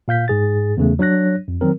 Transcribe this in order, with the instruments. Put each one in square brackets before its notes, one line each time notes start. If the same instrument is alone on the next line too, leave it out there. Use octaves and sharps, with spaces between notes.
[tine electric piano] A#2 F5 G6 B6
G#2 G#4 A6
E2 C#3 A3
F#3 D4 C#5 F#6 A#6
F2
D#3 F#3 C4 A#4